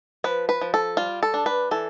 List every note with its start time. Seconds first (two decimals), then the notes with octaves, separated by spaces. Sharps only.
0.24 F3 B4
0.49 B4
0.61 F3
0.74 A4
0.97 G3 F4
1.23 A4
1.34 D4
1.46 B4
1.71 E3 A4